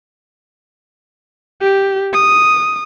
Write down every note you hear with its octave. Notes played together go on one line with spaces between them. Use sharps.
G4
D#6